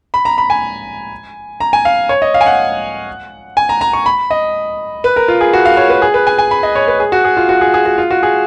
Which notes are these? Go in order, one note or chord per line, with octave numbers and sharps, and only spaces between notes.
B5
A#5
B5
G#5
A#5
G#5
F5
C#5
D#5
F5
G#5
F#5
G#5
A#5
A#5
C#6
B5
D#5
B4
A#4
F4
G#4
F#4
F5
C#5
B4
G#4
B4
G#5
G#5
B5
D#5
C#5
B4
G#4
F#4
G#4
F4
F#4
G#4
G#4
F#4
F4
F#4
G#4